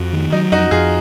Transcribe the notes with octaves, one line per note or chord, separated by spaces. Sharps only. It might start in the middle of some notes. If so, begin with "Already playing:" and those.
Already playing: F2 F#4
D#3
F#3 D#4
F2 D#4 F#4
F2 F4 G#4